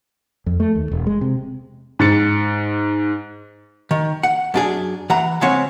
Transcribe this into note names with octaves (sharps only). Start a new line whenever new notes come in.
F2
A3
D#2
E1
G#3
C3
G#2 A6 C#7
D#3
F#5
F#2 D4 G#4
E3 F#5 A#5
C#3 F3 G#3 C4 C#5 F#5